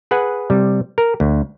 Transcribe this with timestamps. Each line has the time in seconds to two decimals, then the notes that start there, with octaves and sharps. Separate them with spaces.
0.11 G#4 B4 F#5 G#5
0.50 C3 G3
0.98 A#4
1.20 D2